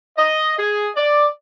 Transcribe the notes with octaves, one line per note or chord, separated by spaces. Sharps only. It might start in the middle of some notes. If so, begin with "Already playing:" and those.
D#5
G#4
D5